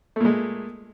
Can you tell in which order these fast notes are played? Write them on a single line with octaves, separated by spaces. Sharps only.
A3 A#2 G#3